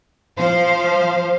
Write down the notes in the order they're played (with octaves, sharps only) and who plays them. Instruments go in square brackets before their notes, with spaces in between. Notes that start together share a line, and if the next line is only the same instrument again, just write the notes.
[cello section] F3 C5 F5